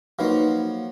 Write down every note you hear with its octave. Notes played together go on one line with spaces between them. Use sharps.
F3 F#3 A#3 D#4 B4 F5